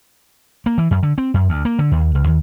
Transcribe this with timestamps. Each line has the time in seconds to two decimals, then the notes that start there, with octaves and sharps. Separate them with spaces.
0.66 A#3
0.78 E3
0.91 F#2
1.03 D3
1.18 C4
1.34 F#2
1.49 D2
1.65 A#3
1.79 D3
1.91 D#2
2.15 C#2
2.27 D#2